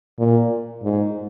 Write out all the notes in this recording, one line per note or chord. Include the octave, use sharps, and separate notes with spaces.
A#2
G#2